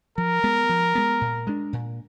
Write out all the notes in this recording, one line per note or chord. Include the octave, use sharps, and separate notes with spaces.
F3 A#4
G#3 B3
F3
G#3 B3
A#2
G#3 D4
A#2